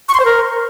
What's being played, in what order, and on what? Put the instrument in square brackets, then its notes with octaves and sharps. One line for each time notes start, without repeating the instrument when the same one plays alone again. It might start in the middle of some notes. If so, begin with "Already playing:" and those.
[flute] C#6
C6
C5
A#4